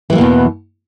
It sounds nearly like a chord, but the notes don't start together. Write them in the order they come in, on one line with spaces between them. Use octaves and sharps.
E3 G3 A#3 B2 E2